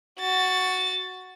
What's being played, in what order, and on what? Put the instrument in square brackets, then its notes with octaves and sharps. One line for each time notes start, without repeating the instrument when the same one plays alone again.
[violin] F#4 A6